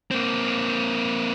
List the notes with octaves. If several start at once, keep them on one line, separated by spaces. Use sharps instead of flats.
A#3 C4